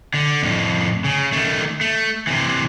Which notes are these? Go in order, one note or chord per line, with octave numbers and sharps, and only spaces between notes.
D3
F2 A2
C#3
D#3 A3
A3
C3 E3